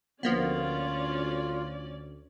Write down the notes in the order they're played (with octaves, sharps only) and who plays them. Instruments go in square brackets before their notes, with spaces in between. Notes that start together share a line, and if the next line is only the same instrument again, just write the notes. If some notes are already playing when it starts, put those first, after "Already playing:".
[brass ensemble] D2 [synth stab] F3 A#3 B3 [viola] C#4 D5 [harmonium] F4